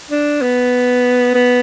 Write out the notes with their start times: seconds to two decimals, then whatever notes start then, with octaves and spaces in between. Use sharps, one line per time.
0.10 D4
0.41 B3
1.34 B3